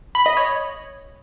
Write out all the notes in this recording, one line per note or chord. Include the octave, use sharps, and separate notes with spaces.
B5
D#5
C#5